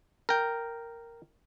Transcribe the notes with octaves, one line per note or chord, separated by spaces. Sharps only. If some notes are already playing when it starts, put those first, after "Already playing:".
A#4 G5